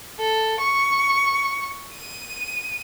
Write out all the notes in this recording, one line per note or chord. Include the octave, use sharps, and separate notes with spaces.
A4
C#6
D#7